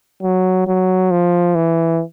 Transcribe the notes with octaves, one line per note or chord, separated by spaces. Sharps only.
F#3
F#3
F3
E3